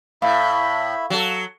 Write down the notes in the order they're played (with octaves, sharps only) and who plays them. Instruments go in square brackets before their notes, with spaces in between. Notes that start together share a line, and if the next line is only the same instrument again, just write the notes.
[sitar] A2 [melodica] E4 E5 B5 [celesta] F5
[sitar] F#3 A4